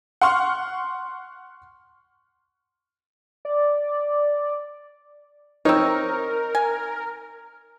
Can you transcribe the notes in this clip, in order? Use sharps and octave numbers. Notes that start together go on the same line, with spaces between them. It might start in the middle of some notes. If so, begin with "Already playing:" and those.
F#5 C6 C#6 F6
D5
C4 D#4 A#4 C#5
G#5